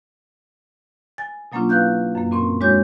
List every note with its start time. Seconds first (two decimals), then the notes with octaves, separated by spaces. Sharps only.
1.18 G#5 A6
1.52 B2 F#3 A#3 C#4 D4 F4
1.69 E4 B4 F5 F#6 G6
2.15 F#2 A#3
2.31 A#2 C4 C#4 C6
2.60 E2 G#3 D4 F#4 C#5 G6